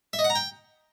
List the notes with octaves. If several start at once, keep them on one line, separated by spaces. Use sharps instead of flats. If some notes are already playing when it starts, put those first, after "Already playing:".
E5
D#5
F#5
A#5
G5